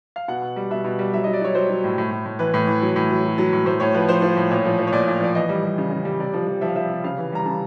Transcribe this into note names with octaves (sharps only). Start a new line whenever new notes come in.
F5
B2 F#5
B2
G3
B2 E5
B2
G3
F#3 E5
F#3 D#5
D5
F#3 C#5
F#3 C5
F#3
A2
A2
A2
A2
E3 B4
A2
E3
F#3
A2
F#3
F#3
F#3
A2
A2 C5
A2 C#5
F3 B4
F3 C5
F3
A2
A#2 C#5
F3
F3
C#5
A#2 D5
A#2
F3 D5
E3 D#5
G3
G3
C#3
C#3
G3
C3 D5
F3
F3
F3 E5
F5
F3 E5
C3
C#3 F5
E3
G3 A#5
C#3 A5